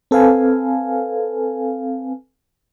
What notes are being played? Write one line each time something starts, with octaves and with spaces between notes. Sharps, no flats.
C4 A4 B4 F5 G#5